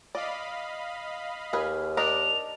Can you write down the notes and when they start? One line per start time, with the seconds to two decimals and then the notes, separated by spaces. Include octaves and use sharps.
0.15 D5 D#5 F5 B5
1.53 D#2 G#4 B4 F6
1.97 D4 D#4 A#4 F7